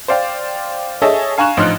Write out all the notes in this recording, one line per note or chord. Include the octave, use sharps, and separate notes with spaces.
C5 D5 F5 G5
G#4 A4 C#5 D#5 E5 A5
F5 G#5 A#5 C#6 F#6 E7
A1 F3 D#4 C6 F6 F#6